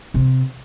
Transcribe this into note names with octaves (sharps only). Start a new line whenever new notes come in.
C3